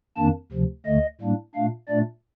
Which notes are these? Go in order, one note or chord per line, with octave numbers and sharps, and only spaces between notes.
F2 D#3 A#3 D4 A5
D2 C3 F3
D2 D3 A3 D#5
A2 G3 A#3 D4
A#2 A3 D4 F5
A#2 A3 D4 D5